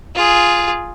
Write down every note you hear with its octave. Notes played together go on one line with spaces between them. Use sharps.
F4 G#4